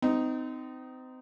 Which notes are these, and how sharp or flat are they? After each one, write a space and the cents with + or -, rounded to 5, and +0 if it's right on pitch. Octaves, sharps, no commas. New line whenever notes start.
C4 -35 D#4 +0